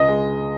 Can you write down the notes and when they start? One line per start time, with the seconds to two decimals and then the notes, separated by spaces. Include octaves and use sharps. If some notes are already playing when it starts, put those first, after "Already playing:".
Already playing: C#2 D#5
0.08 G#3